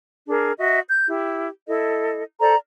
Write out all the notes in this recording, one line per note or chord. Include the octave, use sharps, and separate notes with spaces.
D4 G#4 A#4
F#4 D#5 E5
G6
E4 G4
E4 A4 D#5
A4 C5 D5 A#5